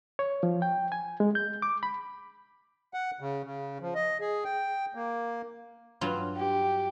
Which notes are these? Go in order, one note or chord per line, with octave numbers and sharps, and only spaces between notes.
C#5
F3
G5
G#5
G#3
G6
D6
B5
F#5
C#3
C#3
F3
D#5
G#4
G5
A#3
G2 F#3 F4
G4